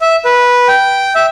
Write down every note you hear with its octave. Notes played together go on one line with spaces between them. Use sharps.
E5
B4
G5
E5